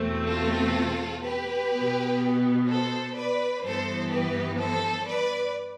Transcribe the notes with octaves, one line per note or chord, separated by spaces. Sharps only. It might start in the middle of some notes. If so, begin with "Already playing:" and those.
Already playing: E2 B2 A3 C4
F4 A4
G4 B4
B2 B3
A4 C5
B4 D5
G2 E3 B3 A4 C5
G4 B4
A4 C5
B4 D5